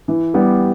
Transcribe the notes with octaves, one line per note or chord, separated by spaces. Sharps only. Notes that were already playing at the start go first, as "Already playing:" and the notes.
E3
G3 B3 G4